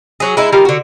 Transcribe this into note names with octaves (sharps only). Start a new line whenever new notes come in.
F#3 G#4
G#3 D#4 E4
G3 D#4 F4 A#4
D3 F#4